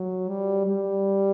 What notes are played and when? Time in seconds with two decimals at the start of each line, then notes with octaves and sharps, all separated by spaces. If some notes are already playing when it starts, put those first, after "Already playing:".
Already playing: F#3
0.29 G3
0.67 G3